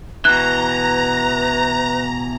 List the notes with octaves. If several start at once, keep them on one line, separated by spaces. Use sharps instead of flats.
B2 E3 B4 A#5 F#6